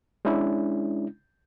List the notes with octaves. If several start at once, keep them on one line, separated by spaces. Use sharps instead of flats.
G#3 C#4 D4 E4